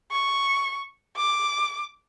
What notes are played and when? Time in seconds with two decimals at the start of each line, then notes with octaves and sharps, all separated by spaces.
0.12 C#6
1.17 D6